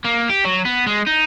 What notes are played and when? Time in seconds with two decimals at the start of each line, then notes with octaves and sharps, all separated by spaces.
0.04 A#3
0.29 G4
0.45 F#3
0.65 B3
0.86 G#3
1.07 D#4